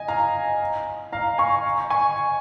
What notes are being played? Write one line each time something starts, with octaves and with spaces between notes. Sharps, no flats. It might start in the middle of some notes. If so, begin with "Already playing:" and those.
Already playing: D#5 G#5
F5 A#5
F5 A#5
G#5 C#6
G#5 C#6